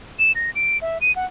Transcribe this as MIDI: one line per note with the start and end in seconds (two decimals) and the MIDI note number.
0.19 0.32 100
0.35 0.50 94
0.55 0.80 98
0.81 0.98 76
1.01 1.14 99
1.16 1.26 78